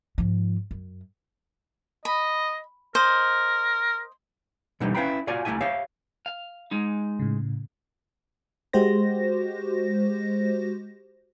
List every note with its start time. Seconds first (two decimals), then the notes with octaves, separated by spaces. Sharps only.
0.18 G#2 F3
0.71 F#2
2.05 D#5 B5
2.95 A#4 C5 D#5
4.80 B2 D3 E3 G3 D#4
4.94 C#4 E4 B4 F5 G5 B5
5.27 F4 F#4 D5 F5 G#5
5.45 C2 A3 C#4 E4 G4 G#5
5.61 G4 C#5 E5 F5
6.26 F5
6.71 G#3 D#4
7.19 A2 C#3
8.73 G#3 F#4 G4 C5 A#6